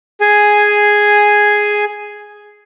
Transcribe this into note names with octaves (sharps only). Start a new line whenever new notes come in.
G#4 G#5